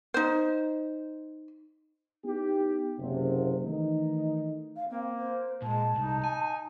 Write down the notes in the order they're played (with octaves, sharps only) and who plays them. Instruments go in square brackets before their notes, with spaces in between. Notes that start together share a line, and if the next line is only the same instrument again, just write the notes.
[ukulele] D#4 C5
[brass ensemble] B3 D#4 E4 G4
F#1 C3
D#3 E3 A3 D#4
[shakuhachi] F5
[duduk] A#3 [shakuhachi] C4
[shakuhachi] C5
[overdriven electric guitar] A#2 [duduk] G#3 [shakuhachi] A5
[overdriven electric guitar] C2 [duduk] D#4
[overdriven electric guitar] G#5